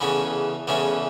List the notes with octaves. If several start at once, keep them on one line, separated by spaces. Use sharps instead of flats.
E2 C#3 E3 A3 C#4
E2 C#3 E3 A3 C#4